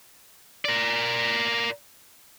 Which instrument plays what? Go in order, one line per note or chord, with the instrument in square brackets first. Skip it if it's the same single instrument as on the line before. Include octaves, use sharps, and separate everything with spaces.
[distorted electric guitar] A#4 D5